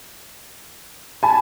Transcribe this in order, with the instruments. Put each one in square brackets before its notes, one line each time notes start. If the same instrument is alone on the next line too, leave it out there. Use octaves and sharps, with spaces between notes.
[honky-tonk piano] G#5 B5 [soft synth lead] A5